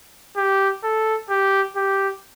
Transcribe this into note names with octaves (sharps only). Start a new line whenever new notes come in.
G4
A4
G4
G4